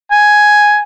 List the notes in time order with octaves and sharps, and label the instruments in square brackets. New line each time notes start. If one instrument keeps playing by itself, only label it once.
[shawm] G#5